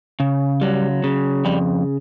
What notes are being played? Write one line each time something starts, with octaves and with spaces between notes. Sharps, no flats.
C#3
F#3 G3
C#3
F2 G3